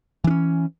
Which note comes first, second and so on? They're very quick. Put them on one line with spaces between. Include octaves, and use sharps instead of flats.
E3 D4 C#4